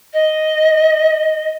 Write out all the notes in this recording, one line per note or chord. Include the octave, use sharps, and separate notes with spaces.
D#5